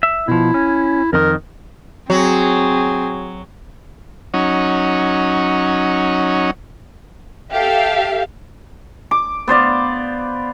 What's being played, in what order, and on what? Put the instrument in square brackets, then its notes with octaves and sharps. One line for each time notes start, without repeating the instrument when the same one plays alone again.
[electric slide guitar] E5
[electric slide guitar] B2 F3 [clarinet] E4
[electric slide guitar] C#4
[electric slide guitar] F2 D#3 [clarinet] A#4
[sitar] F#3 F#4 [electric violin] C4 G#4
[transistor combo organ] F#3 C#4 D#4
[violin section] G4 A4 E5 F5
[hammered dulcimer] D6
B3 C5 D5 F5